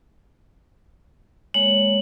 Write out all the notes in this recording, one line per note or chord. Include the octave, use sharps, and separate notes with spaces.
G#3 A#3 C#5 F#7